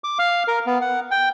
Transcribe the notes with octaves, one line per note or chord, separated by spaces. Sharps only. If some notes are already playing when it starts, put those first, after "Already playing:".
D6
F5
A#4
B3
F#5
G5